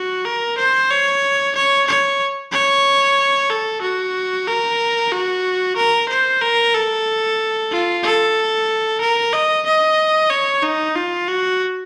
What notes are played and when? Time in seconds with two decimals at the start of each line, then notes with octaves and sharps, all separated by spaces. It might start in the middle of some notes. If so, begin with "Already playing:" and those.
Already playing: F#4
0.25 A#4
0.58 C5
0.90 C#5
1.56 C#5
1.88 C#5
2.52 C#5
3.50 A4
3.82 F#4
4.47 A#4
5.12 F#4
5.77 A#4
6.09 C5
6.41 A#4
6.74 A4
7.71 F4
8.04 A4
9.01 A#4
9.33 D#5
9.66 D#5
10.30 C#5
10.63 D#4
10.96 F4
11.28 F#4